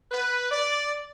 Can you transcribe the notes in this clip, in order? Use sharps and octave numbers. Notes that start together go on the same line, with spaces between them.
B4
D5